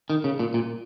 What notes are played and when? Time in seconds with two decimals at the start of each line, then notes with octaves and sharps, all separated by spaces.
0.10 D#3
0.24 C#3
0.39 A#2
0.54 A#2